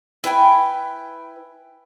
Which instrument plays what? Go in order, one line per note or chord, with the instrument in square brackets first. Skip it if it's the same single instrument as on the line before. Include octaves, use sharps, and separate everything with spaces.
[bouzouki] E4 B4 G5 G#5